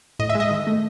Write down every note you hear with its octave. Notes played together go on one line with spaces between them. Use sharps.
A2 D#5
E5
G#3
D#5
D#3
A3